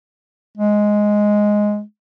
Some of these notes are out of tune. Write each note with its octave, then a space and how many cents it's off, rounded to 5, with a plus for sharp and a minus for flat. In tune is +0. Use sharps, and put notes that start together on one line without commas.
G#3 +5